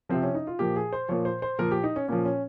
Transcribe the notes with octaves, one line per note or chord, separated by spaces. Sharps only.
C3 F3 C4
C#4
D#4
F4
A#2 F3 G4
G#4
C5
A#2 F3 C#5
C5
C5
A#2 F3 A#4
G4
D#4
C#4
A#2 F3 C#4
C#4